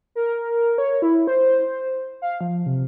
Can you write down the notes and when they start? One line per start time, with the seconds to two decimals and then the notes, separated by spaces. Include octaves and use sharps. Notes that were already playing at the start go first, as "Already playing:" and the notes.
0.15 A#4
0.78 C#5
1.02 E4
1.27 C5
2.22 F5
2.41 F3
2.66 C3